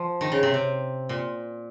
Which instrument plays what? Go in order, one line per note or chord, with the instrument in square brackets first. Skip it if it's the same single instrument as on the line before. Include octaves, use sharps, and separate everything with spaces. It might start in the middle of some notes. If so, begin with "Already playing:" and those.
Already playing: [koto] F3
D#3
C#3
C3
C3
A#2